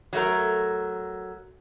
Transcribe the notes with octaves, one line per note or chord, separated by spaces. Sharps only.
F#3 A3 A#4